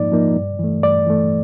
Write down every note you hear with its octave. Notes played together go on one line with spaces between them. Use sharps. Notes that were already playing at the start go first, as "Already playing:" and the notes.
Already playing: G#2 F3 A#3 D#4 D5
F3 A#3 D#4
G2
E3 A3
G2 D5
E3 A3